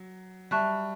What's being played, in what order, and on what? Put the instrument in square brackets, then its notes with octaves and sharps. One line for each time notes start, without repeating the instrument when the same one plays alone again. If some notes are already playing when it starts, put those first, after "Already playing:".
Already playing: [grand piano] F#3
[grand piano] G3 [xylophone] E5 A5 C#6 F#6